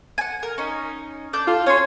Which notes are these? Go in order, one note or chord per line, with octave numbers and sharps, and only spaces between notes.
F#5 G#5
A#4
C#4 D#4
D4 D5 G6
F4 A4
C#4 C#5 G#5 C6